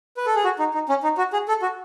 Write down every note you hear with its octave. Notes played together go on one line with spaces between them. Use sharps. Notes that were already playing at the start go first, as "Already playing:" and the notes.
B4
A4
G#4
F#4
D#4
D#4
C#4
D#4
F#4
G#4
A4
F#4